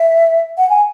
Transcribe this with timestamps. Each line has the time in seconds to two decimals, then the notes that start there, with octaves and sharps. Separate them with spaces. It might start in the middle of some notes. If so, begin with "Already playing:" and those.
Already playing: E5
0.57 F#5
0.69 G#5